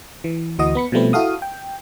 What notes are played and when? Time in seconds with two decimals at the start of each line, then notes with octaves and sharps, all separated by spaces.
0.24 E3
0.59 D2 E3 F#4 D#5 D#6
0.75 B3 B5 C#7
0.92 B2 F3 G3 A3 C4 B4
1.13 E4 F#4 A4 F5 D#6
1.42 G5